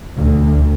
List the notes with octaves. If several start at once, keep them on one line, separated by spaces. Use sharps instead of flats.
D2